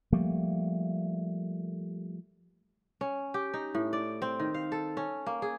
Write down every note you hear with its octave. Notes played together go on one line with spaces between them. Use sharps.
F3 G3 A3 A#3
C#4
G4
D#4
A2
D5
C4
D#3
F5
A4
C#4
A#3
G#4